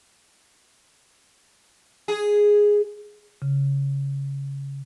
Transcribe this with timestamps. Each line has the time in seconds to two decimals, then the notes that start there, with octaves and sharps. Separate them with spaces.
2.08 G#4
3.42 C#3